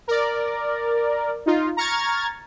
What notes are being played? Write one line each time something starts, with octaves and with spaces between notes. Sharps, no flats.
A#4 D5
D#4 F4
A#5 C#6 F6 G#6 A6